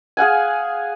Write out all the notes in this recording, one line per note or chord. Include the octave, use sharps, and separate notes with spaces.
G#4 F5 F#5 G#5